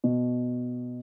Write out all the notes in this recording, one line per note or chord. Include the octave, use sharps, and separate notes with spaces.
B2